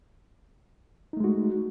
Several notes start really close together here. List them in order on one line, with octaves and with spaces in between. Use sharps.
D#4 A3 G#3 F#4